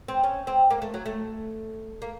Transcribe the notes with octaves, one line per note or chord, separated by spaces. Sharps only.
C4
C#4
C4
A#3
A3
F#3
A3
A#3